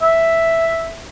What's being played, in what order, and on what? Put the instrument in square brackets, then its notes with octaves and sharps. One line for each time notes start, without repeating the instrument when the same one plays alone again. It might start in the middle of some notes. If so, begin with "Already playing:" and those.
[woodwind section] E5